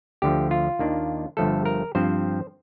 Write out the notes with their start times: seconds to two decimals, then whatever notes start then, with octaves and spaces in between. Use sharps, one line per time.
0.22 D2 D3 F3 G4
0.51 F4
0.79 D#2 D#3 A#3 D4
1.37 G1 G2 F3 A3 A4
1.65 A#4
1.95 G2 F3 C4 C5